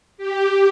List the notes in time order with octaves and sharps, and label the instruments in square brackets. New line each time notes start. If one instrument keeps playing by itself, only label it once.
[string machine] G4